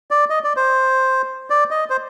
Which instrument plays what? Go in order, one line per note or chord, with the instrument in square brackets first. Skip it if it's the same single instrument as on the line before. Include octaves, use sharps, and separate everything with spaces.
[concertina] D5
D#5
D5
C5
D5
D#5
C5